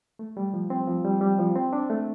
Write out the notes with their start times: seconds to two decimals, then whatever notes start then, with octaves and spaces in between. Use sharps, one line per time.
0.19 A3
0.37 G3
0.54 F3
0.70 C4
0.88 F3
1.04 G3
1.21 G3
1.39 F3
1.56 C4
1.73 D4
1.90 A3